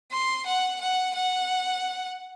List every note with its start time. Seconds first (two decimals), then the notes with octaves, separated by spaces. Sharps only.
0.12 C6
0.46 F#5
0.81 F#5
1.15 F#5